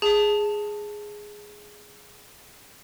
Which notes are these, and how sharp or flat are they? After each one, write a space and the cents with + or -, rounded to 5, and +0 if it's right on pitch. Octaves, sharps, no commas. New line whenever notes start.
G#4 +0 A5 +0